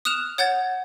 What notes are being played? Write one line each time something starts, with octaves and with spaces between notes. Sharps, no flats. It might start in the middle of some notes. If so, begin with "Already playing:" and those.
D#6 F6 F#6 E7 F7
C#5 F#5 G6 A6